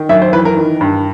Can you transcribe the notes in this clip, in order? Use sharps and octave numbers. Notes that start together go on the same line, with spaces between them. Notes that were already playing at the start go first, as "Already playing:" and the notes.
Already playing: D#3
F#2 E5
C5
E3 B4
A#4
D#3
G2